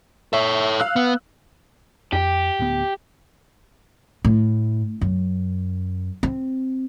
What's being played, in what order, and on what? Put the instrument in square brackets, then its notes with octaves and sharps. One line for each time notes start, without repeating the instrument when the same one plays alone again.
[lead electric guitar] A4 C#5 [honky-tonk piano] E5
[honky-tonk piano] F5 E6 F#6
[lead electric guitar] B3
[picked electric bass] F2 [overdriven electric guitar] G4
[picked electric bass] D1 D2 B3
[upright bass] A2
F#2
C4